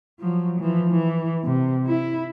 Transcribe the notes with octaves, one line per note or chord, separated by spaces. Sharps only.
F3 F#3
E3 F3
E3
C3
E4